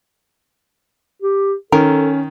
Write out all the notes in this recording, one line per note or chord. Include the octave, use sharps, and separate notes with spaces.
G4
D#3 C#4 A4 A#4